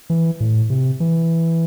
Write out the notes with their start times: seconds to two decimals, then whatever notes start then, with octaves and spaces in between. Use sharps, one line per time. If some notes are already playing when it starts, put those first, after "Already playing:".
0.10 E3
0.40 A2
0.70 C3
1.00 E3